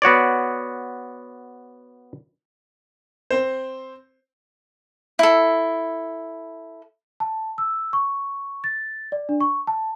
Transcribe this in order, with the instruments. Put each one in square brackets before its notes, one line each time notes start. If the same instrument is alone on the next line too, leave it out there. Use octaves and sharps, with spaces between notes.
[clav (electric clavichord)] B3 F#4 C#5 D5
[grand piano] C4 C5
[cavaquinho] E4 A4
[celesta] A5
E6
C#6
A6
D5
D4
C#6
A5